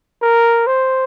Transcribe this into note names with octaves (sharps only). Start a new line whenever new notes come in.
A#4
C5